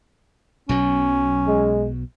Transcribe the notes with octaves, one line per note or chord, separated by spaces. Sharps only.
B1 B2 F#3 C#4
G#3